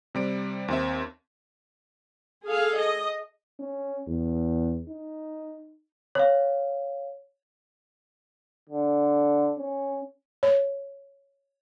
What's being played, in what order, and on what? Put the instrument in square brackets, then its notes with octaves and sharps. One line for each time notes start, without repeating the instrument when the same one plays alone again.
[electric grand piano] C3 G3 D7
D#2 C4 E5
[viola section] G#4 A4 F5
D#5
[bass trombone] C#4
E2
D#4
[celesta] C#5 F5
[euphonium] D3
C#4
[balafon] C#5